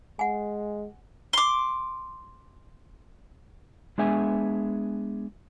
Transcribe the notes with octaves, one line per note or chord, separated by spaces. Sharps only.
G#3 F#5 G#5
C6 D6
G#3 B3 D4 G#4 E5 G#5